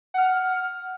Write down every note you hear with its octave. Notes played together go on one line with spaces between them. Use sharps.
F#5 F6